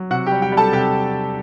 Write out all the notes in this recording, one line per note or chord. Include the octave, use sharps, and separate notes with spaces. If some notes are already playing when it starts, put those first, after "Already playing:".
Already playing: F#3
C3 F#4 F#5
G4 G5
G3
G4 G5
G3
A4 A5
C3 G4 G5